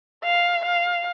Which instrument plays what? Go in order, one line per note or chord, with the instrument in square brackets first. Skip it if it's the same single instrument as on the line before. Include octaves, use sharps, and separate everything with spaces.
[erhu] F5
F5